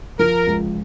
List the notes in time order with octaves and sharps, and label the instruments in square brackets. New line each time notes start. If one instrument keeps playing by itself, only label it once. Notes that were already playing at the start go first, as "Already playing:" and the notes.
[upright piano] F3 [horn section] A#4
[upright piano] C#2